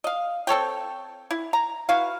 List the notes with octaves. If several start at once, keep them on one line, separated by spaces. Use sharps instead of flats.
D#5 F5
C4 A4 C#5 G5
E4
A#5
E4 F#4 B4 F5